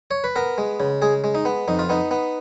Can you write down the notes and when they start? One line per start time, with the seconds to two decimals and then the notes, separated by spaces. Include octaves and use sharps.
0.11 C#5
0.24 B4
0.36 B3 A#4
0.58 G#3
0.80 C#3
1.02 G#3 G#4
1.24 G#3
1.35 D#4
1.45 B3
1.68 F2 D#4
1.79 F4
1.89 B3 D#4
2.11 B3